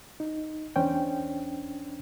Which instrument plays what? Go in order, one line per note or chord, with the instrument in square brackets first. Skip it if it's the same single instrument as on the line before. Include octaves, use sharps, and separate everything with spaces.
[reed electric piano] D#4
E2 C#4 D4 C5 G5